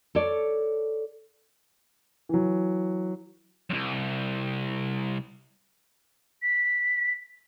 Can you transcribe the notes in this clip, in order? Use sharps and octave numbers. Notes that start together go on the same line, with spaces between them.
A4 C#5 D5
E3 F#3
C2 F#2
B6